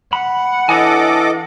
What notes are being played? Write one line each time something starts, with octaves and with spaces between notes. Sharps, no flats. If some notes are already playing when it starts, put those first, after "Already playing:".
F#5 B5
E3 D4 A4 C#5 D#5 G#5 D6